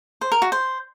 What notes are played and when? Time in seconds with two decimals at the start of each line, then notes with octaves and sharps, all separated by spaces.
0.21 C5
0.32 A#4
0.42 F#4
0.52 C5